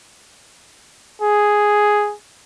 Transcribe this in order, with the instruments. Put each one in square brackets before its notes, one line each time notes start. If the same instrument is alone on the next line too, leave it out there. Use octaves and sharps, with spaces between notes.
[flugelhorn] G#4